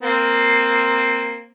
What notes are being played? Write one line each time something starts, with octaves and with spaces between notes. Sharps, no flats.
A#3 C4